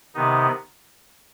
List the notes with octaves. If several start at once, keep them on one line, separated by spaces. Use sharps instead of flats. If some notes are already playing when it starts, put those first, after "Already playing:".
C3 D#3 B3 D#4